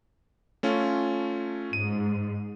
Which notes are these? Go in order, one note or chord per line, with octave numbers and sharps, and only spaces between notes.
A3 C#4 F4
G#2 D#7